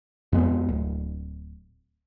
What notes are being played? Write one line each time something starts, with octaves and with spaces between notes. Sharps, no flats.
F2 G#3 B3
D1